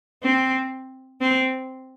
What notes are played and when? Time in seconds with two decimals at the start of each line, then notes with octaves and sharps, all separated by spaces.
0.23 C4
1.21 C4